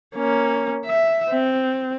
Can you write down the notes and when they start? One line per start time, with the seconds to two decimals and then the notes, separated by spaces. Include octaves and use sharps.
0.16 A#3 C#4
0.86 E5
1.30 C4